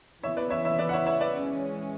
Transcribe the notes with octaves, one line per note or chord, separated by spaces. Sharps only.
C#3 E3 B3 C#5 E5
B4 D5
C#5 E5
C#5 E5
B4 D5
F#5
C#5 E5
C#5 E5
B4 D5
E3 G#3 C#4